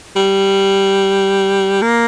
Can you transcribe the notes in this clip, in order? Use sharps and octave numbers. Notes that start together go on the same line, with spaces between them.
G3
A#3